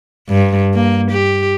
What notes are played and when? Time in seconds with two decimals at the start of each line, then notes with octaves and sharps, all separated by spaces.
0.29 G2
0.74 A#3
1.11 G4